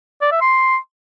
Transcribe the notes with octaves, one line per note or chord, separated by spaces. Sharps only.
D5
E5
C6